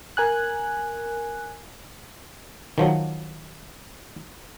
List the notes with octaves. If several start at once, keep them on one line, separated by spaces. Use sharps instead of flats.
A#4 G#5 F#6
D#3 F3 F#3